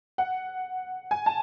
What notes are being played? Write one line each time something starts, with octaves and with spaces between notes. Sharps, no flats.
F#5
G#5
A5